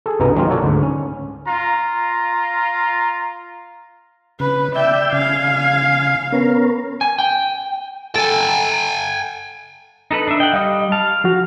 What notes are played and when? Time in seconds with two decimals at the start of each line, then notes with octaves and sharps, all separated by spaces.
0.06 G#4 A4
0.20 C2 G2 B2 B3 D#4 A#5
0.35 D#3 F#3 G#3 A#3 C4 F4
0.50 F#4 A4 A#4 C#5 D5
0.63 D2 G#2
0.83 C#4
1.47 F4 A#5
4.40 C#3 B4
4.76 D5 E5 G5 E6 G6
5.12 C#3 F5 G#5
6.32 B3 C#4 A#4
7.01 G#5
7.19 G5
8.16 A4 G5 G#5
10.11 D#4 A4 B4
10.27 D4 E5
10.40 D#5 F#5 G5
10.53 G3 D#5 F5
10.92 F5 A5
11.24 F3 F#4